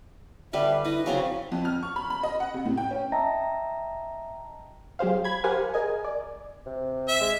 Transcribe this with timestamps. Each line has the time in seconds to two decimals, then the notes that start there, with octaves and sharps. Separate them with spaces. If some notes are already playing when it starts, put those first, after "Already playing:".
0.53 D3 G3 B4 E5
0.85 E4 B4 D#5
1.06 C#3 F#3 C4 F5
1.52 F2
1.65 F6
1.83 C#6
1.96 B5
2.10 B5
2.23 D#5
2.40 F#5
2.54 C3
2.66 A2
2.77 G5
2.91 C#4
3.12 D#5 E5 G5 A5 A#5 A#6
4.99 F#3 G4 G#4 C5 F5
5.24 B5 G#6
5.44 G4 A#4 C5 F5 F#5 G#5
5.74 G#4 A#4 D#5 G#5
6.04 D5
6.66 C3
7.08 E5
7.21 G#3